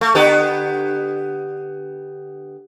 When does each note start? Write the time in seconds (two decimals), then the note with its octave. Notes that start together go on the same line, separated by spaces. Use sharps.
0.01 A3
0.15 D3 B3 G4